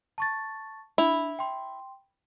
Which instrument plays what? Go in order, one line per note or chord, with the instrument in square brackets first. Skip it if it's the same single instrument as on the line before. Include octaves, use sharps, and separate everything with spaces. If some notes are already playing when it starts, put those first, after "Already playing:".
[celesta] A5 C#6 A6
[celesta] D4 F7 [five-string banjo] E4
[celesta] G5 C6